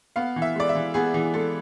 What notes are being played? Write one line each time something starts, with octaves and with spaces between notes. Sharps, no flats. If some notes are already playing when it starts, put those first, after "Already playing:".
B3 F5
E3
E5
G#3 D5
E5
E3
B3 G#4
E3 G#4
G#3 A4